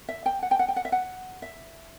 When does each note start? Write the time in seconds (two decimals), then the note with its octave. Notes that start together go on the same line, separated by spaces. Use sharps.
0.08 E5
0.26 G5
0.42 F#5
0.51 G5
0.59 F#5
0.68 G5
0.76 F#5
0.85 E5
0.92 F#5
1.42 E5